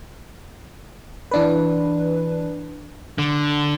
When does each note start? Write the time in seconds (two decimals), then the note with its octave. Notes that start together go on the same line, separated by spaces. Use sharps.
1.31 E3 D4 B4
3.18 D3